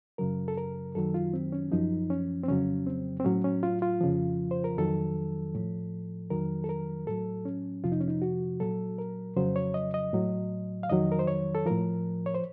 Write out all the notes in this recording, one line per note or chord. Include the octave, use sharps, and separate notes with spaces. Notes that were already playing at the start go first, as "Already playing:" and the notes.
F#2 C#3 F#3 A#4
A4
A#4
F#2 D#3 F#3 A4
F4
C4
C#4
F#2 F3 D#4
C#4
C4
F2 C#3 F#3 C#4
C4
C4
A2 F#3 C#4
C#4
F4
F4
F2 C#3 F3
C5
A#4
F2 D#3 F#3 A4
A2 F3
F2 D#3 F#3 A#4
A4
A#4
A2 F#3 A4
C#4
F2 C3 F3 F4
D#4
C#4
D#4
F#4
A#2 F#3 A4
A#4
F2 C#3 F#3 C5
C#5
D#5
D#5
A2 F#3
F5
F2 D#3 F#3 D#5
A#4
C5
C#5
A4
A2 F3 A#4
C#5
C5